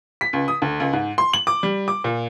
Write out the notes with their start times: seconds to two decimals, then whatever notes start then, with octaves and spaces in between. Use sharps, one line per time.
0.21 B6
0.33 C#2
0.48 D#6
0.62 D2
0.80 C#2
0.93 G#2
1.18 C6
1.33 F#7
1.47 D6
1.63 G3
1.88 D6
2.04 A#2